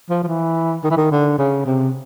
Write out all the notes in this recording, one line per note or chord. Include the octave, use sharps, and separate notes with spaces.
F3
F3
E3
D#3
E3
D#3
D3
C#3
C3